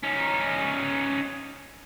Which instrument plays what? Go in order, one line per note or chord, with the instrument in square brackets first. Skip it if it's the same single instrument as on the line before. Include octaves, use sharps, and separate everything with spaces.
[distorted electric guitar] C#4 D#4